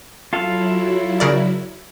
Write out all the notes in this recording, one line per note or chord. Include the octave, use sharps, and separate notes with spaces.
F#3 E4 F4 A4 F5
C#3 A#4 D5